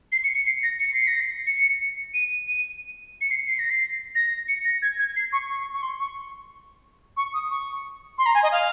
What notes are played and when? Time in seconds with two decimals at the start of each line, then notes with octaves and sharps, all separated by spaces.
0.12 C7
0.24 C#7
0.34 C#7
0.46 C7
0.63 A#6
0.80 C#7
0.94 C7
1.08 A#6
1.21 C7
1.47 C#7
2.14 D#7
2.48 D#7
3.21 C#7
3.31 C7
3.49 C7
3.59 A#6
3.70 C7
4.15 A#6
4.48 C#7
4.65 A#6
4.82 G#6
4.99 G#6
5.16 C7
5.33 C#6
5.49 C#6
5.73 C#6
5.82 C6
6.00 C#6
7.17 C#6
7.34 D#6
7.50 C#6
8.18 C6
8.26 A#5
8.34 G#5
8.43 D#5
8.52 F5